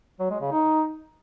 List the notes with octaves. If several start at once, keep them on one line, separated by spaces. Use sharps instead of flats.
F#3
G#3
C#3
D#4